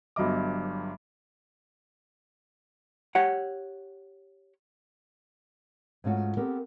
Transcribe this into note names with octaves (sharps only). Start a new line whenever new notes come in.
G1 G2 F#3 D#5 D6
G4 C#5 F#5
G#2 A3 C#4 F4 F#4
B3 C4 G4 A4 A#4